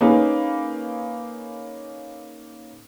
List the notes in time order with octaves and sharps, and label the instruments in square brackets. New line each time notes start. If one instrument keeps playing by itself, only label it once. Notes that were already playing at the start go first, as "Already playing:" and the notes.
[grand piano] A#3 C#4 D#4 G#4 B4